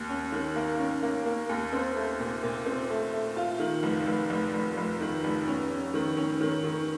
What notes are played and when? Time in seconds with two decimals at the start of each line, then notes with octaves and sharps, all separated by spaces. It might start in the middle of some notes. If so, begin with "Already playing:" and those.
Already playing: D#2
0.09 C#4
0.32 D#3
0.56 A#3
0.79 C#4
1.02 A#3
1.26 A#3
1.49 D#2
1.73 C4
1.96 A3
2.19 A#2
2.43 A#2
2.66 C4
2.90 A3
3.13 A3
3.36 F4
3.60 D#3
3.83 F1
4.07 F1
4.30 F1
4.54 F1
4.77 F1
5.01 D#3
5.24 F1
5.47 C#4
5.71 C#4
5.94 D#3
6.17 C#4
6.41 D#3
6.64 D#3